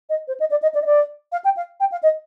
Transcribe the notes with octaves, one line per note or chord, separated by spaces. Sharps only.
D#5
C5
D#5
D5
D#5
D5
D#5
D5
F5
G5
F5
G5
F5
D#5